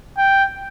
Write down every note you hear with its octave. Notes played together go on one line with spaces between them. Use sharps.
G5